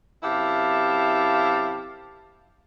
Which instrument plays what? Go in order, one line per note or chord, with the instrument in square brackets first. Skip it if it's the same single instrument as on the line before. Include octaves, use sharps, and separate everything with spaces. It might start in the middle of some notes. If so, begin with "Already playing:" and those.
[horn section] F#2 C3 E4 G4 F5 A5